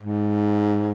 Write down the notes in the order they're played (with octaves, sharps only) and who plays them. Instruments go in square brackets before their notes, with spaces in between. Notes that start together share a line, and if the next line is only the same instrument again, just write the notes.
[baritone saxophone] G#2